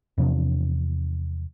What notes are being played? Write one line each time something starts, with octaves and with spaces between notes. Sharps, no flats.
E2 C3 F3 D4